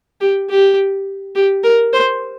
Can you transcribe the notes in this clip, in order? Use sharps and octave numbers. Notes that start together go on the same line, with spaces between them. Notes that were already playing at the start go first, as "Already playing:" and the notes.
G4
G4
G4
A#4
C5